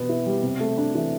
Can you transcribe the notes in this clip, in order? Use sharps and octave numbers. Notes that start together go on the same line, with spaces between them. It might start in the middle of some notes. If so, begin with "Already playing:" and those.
Already playing: B2 B3
E4
G3
C3
A3
D4
E3